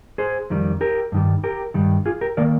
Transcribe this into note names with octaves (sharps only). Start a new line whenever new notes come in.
G#4 C5
F2 D#3 G3
G4 A#4
G2 D#3 G3
G4 A#4
G2 D#3 G3
F4 G#4
G4 A#4
D#3 A#3 A#4 D5